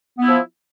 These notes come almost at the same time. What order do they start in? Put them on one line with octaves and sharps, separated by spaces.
B3 E4 F3